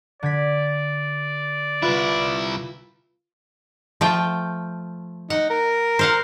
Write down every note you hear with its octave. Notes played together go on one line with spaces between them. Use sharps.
D3 D5 G#6 B6
C2 E4 F4 B4
F3 A3 G5
D#4 F#5
A#4
C5 F5 F#5